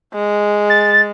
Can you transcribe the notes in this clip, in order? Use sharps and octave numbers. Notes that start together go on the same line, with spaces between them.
G#3
A6